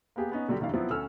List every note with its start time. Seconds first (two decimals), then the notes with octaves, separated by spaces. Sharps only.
0.16 A#3 B3 G4 G#4 F5
0.32 B3 C#4 D#4
0.48 D3 F#3 G3 F#4 G4
0.60 F1 D#2 D#3 D4 E4 F5
0.74 F3 F#3 B3 C4 E4 F4
0.90 D2 C#4 A4 E6 F6